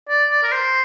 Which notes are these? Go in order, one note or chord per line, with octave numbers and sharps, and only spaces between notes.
D5
D5
A#4
C5